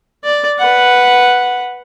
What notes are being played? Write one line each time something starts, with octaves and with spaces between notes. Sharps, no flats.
D5
B4 F#5